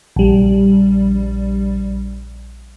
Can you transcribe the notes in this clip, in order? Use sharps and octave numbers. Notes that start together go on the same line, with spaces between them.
A#1 G3